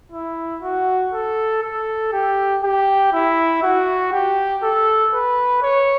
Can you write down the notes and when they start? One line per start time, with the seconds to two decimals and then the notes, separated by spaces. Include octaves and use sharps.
0.12 E4
0.63 F#4
1.13 A4
1.62 A4
2.12 G4
2.63 G4
3.13 E4
3.63 F#4
4.12 G4
4.63 A4
5.13 B4
5.62 C#5